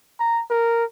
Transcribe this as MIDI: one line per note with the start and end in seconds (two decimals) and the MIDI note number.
0.20 0.42 82
0.50 0.84 70